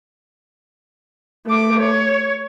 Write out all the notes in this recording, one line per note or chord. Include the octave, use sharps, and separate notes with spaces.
A3 D6
C#5